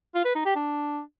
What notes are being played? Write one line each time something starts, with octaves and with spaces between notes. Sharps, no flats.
F4
B4
D#4
G4
D4